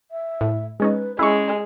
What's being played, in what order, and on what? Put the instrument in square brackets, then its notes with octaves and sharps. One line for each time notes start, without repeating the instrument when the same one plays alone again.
[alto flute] E5
[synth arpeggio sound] A2
[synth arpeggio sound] G#3 C#4 D#4 [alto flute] B4
[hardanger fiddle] G#3 [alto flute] C#4 [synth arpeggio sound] E4 C#6